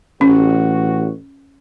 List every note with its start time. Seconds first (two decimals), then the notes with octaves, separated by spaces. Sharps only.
0.21 A1 C#4 F#4